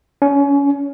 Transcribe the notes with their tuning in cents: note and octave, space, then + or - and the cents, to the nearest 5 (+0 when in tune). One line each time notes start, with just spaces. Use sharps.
C#4 +25